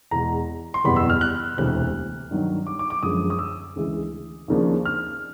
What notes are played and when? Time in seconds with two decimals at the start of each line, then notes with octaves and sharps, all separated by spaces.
0.11 E2 B2 G#3 A#5
0.74 C6
0.84 F#1 E2 B2 G3 B3 B5
0.96 E6
1.10 F6
1.21 F#6
1.58 E1 D2 C3 E3 F#6
2.31 G2 D#3 F#3
2.67 D6
2.79 D6
2.90 D6
3.03 F#2 D3 F3 G#3 D#6
3.30 D#6
3.39 E6
3.76 D2 C#3 E3 G#3
4.48 D#2 C#3 F3 A#3 D4
4.85 F6